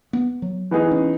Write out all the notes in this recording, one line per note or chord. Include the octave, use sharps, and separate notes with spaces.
B3
F#3
E3 B3 D#4 G#4
C#4